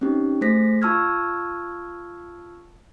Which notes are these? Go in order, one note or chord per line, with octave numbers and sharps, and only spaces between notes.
C4 C#4 D#4 G4
A3 G#4 C5 A#6 B6
F4 A5 C#6 E6 F6 G#6